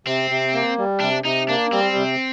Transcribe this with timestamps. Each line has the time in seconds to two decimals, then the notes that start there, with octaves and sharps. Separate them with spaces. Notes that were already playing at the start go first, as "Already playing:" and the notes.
0.07 C3 C4
0.30 C3
0.53 A#3
0.78 G3
1.01 C3 D4
1.24 C3 D#4
1.49 A#3 D4
1.72 G3 C4
1.96 C3